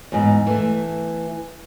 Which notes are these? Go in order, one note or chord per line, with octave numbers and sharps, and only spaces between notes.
E2 G#2
E3 A3